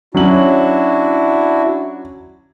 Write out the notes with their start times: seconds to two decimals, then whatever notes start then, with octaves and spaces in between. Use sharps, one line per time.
0.14 F#3 C#4 D4 E4 F#4 F#7